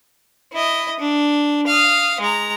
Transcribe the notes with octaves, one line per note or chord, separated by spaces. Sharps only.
E4 D#5
D4
F5 D#6
G#3 A#5